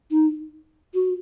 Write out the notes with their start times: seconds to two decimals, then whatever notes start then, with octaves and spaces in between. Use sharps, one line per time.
0.11 D#4
0.94 F#4